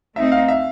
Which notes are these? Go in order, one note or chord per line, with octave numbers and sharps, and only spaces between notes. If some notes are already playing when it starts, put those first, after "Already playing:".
A3 C4 D#4 E5
F5
E5